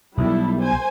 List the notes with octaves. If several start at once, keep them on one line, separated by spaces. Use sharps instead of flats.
B1 G3 E4 A4
C5 G#5